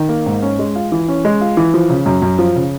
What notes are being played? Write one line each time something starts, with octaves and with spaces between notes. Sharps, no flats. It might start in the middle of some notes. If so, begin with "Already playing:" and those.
Already playing: D#3
A#3
G#2
C#4
G#3
F4
E3
C#4
G#3
F4
E3
F3
C#3
F#2
F#2
F3
C#3